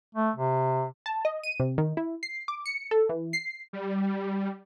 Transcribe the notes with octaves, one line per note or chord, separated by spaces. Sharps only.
A3
C3
A5
D#5
D#7
C3
D#3
E4
C7
D6
C#7
A4
E3
C7
G3